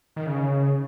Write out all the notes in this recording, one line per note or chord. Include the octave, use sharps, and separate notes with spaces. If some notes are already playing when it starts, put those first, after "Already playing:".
D#3
C#3